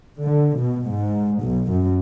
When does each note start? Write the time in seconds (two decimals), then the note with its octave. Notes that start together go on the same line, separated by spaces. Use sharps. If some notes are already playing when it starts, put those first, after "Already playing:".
0.21 D3
0.56 B2
0.89 G#2
1.41 B1
1.71 F#2